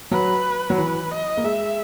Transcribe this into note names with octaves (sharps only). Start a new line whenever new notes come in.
F#3 B4
F#3
E3 B4
D#5
A#3
G#3 E5